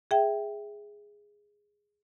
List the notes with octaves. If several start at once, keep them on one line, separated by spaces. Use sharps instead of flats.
G#4 E5 G5